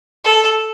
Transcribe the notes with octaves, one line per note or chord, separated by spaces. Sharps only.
A4